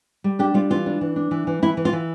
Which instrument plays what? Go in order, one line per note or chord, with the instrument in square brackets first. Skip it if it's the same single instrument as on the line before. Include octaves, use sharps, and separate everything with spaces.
[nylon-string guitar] G3
D4 G4
G3 F4
E3 F4
D4
E3
D4
E3
E3
E3 E4
E3
F4
E3